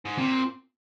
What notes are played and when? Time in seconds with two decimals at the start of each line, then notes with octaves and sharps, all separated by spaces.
0.05 G#2
0.18 A#2 C4